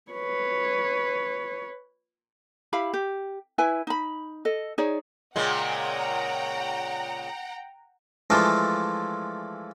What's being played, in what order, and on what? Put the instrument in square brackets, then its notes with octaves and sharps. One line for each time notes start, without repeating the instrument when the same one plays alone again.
[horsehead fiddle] B4 C#5
[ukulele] E4 G4 F5 B5
G4
E4 B4 G#5
D#4 B5
A4 D#5
D#4 G#4 C#5 D5
[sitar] A#2 C#3 G#3 [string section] F#5 G5 A#5
[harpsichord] E3 F3 G#3 A3 D4 F4